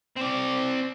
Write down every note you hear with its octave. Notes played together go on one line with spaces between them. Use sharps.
C4 D5